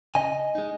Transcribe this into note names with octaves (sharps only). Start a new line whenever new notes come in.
C#3 D#5 G#5
G#3 D#4